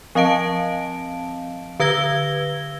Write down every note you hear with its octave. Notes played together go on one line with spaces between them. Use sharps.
F3 C4 D#5 F5 A5 D7
D3 B4 E6 G#6 A#6 G7